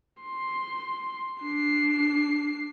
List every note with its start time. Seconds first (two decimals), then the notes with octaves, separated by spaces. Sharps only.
0.23 C6
1.42 D4 C7